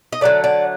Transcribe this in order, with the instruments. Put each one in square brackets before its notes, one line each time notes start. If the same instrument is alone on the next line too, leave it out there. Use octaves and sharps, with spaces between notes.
[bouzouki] D#5
D3 F#3 A3 D5
D5